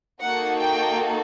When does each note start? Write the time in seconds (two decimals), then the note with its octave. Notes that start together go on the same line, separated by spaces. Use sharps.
0.22 A#3 D#4 F#4 A4 F#5
0.60 G5